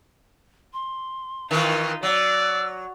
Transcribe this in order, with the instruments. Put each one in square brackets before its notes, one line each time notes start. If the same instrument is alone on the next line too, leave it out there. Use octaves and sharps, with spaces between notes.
[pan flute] C6
[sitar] D#3 E3 [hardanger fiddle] D#4 F4 [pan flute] A#4
[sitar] F#3 [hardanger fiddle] D5 [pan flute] E6